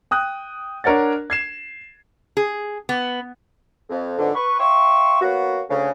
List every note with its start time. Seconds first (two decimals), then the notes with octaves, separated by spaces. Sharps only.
0.11 G5 D#6 F#6
0.84 D4 A#4 C#5 F#5 A6
1.30 G#6 C7 E7
2.37 G#4
2.89 B3
3.90 F2
4.19 F2 G#2 B2 D3
4.35 B4 C#6
4.59 E5 F5 G5 C6 C#6
5.21 F#3 A#3 B3 F#4
5.69 D2 C#3